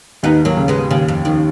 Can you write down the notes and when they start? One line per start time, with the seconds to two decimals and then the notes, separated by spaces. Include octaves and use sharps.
0.23 D#2 B3 D#4
0.45 F#3 A#3
0.57 C#3
0.68 G#3 B3
0.91 D#2 C#3
1.08 F2
1.25 F2 D#3